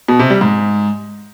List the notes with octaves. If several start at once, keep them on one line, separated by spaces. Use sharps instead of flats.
B2
C3
G3
G#2